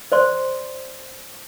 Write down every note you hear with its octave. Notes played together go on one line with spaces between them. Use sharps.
C5 D5 C6